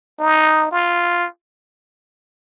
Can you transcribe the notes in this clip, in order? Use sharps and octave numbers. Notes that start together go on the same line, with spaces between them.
D#4
F4